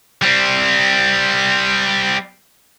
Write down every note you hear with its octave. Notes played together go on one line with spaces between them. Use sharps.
G3 C4